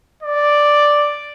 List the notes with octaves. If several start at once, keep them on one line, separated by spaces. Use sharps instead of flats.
D5